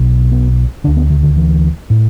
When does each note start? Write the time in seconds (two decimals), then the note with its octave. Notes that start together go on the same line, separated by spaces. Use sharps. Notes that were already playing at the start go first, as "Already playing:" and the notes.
Already playing: B1 B2
0.32 B3
0.84 D2 D3 D4
0.97 B3
1.10 D3
1.23 D3
1.36 E3
1.90 A2